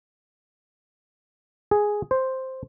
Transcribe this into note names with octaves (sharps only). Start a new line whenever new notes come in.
G#4
C5